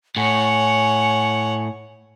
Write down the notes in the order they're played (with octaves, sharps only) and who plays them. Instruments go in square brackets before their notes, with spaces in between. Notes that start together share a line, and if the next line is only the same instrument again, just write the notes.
[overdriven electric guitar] A2 [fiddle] C#5 F#5 [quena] G#5